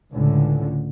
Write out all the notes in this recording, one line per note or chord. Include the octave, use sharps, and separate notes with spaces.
C#2 A2 D3